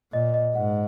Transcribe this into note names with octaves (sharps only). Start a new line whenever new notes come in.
A#2 D#5
D#5
G#2 F#5